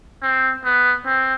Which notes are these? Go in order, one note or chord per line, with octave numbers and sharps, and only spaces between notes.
C4
B3
C4